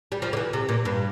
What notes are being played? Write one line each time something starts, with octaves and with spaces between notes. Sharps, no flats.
G3
F3
D3
E3
C3
A#2
G2